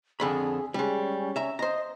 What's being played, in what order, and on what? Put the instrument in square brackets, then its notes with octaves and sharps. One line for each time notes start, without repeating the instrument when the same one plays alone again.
[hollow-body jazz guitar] F2 D3 B5 [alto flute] G#4
[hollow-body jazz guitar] G3 G#3 [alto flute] C#4
[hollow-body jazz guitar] E5 A#5
[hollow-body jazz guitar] C5 A#5 [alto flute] D#5